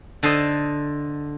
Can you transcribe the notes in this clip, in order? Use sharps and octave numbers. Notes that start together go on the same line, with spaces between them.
D3 A4 C5 D#5